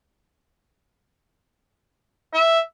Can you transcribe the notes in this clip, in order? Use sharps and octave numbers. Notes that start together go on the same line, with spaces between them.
E5